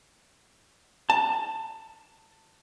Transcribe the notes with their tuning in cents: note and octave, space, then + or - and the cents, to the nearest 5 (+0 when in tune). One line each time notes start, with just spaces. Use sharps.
A5 +20